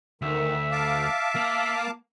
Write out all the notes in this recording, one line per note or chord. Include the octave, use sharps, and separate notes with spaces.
D2 D#3 E5
F5 A5 D6
A#3